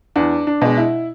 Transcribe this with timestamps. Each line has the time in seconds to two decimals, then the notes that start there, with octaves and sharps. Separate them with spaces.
0.16 E2 D4
0.47 D4
0.61 B2 G#3
0.77 E4